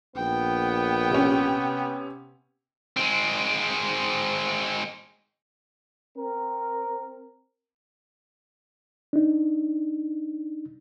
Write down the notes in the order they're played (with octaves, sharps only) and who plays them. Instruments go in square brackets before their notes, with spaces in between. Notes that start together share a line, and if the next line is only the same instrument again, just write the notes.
[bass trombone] A#1 [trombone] B3 [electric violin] G5
[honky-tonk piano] C3 C#4
[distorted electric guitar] G#3 C4
[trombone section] C4 A#4
[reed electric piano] D4 D#4